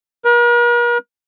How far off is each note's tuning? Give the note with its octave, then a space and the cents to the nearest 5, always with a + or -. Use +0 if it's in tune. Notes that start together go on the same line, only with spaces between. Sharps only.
A#4 +45